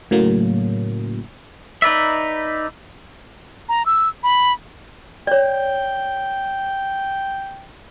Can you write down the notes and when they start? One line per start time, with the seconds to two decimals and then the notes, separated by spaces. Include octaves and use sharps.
0.11 A2 C#3 F#3 A#3
1.82 D#4 B4 D5 E5
3.69 A#5
3.86 E6
4.23 B5
5.27 C#5 D5 G5